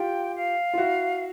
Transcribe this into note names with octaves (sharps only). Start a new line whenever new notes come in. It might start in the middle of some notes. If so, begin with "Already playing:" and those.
Already playing: F4 G4 G5
F5
F4
E4 F#4